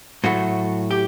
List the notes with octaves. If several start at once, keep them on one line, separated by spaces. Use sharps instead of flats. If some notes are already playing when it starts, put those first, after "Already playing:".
A2 F#3 A3 F#4
G4